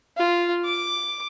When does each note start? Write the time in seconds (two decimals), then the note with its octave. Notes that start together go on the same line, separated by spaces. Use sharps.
0.17 F4
0.65 D6